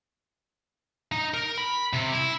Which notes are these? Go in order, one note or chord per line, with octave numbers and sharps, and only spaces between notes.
D#4
A#4
B5
C3
E4